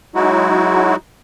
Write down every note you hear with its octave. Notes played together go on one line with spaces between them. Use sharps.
F#3 G#3 D#4 E4 F#4